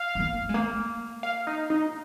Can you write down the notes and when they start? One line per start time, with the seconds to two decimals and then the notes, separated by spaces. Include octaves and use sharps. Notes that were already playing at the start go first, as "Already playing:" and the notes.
Already playing: F5
0.15 G#3
0.20 A#3
0.49 G#3
0.54 A#3
1.23 F5
1.47 D#4
1.70 D#4